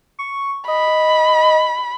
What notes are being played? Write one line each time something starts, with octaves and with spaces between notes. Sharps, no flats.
C#6
D#5 B5